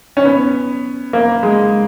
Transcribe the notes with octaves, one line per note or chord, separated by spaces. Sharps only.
C#4
B3
A#3
G#3